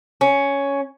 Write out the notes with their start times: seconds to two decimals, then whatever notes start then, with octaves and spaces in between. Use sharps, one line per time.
0.21 C#4